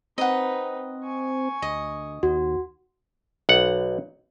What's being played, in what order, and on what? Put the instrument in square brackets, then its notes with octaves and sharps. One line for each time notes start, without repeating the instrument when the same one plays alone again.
[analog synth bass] C4 [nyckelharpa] D#4 B4 [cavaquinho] D#5 F#5
[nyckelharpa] G#5 C#6
[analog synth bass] D2 [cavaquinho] D#5
[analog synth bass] D#2 [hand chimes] F#4
[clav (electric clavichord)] B1 F#5